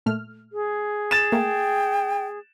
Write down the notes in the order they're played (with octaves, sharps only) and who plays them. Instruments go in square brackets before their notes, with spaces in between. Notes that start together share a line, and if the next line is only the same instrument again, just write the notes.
[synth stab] A#2 A3 F6
[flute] G#4
[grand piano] A6 E7
[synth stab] A3 A#3 [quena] G5